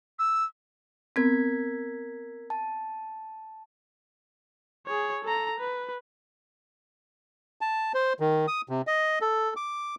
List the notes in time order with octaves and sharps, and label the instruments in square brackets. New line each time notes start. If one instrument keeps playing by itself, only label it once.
[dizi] E6
[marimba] B3 C4 [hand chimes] A#4 G#6 B6
[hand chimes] A5
[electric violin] G#4 C#5
A4 A#5
B4
[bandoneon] A5
C5
D#3
D#6
C3
D#5
A4
D6